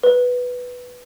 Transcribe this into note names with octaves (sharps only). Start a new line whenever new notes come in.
B4